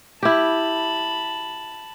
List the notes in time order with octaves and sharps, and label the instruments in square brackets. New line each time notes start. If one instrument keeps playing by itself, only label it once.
[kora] E4 G4 [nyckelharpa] A5 B5